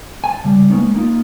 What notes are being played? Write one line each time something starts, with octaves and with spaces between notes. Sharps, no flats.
G#5 A5
C#3 G3
G#3 A#3 B3 C#4 D#4
A#3 D#4 F4